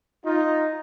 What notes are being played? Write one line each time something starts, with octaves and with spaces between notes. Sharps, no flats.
D#4 F4